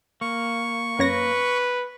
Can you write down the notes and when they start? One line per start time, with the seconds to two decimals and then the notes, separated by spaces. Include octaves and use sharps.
0.21 A#3 C#6
0.99 F#2 B4 C#5 A#6